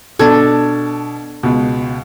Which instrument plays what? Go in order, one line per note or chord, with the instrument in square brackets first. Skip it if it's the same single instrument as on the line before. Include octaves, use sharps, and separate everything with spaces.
[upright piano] B2 G#6 [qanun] D4 A4
[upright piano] C#2 B2